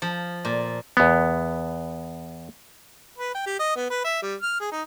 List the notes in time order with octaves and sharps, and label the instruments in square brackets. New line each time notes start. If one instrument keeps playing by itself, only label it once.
[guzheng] F3
A#2
[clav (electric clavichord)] E2 B3
[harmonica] B4
G5
G4
D#5
B3
B4
E5
G3
F6
G#4
D#4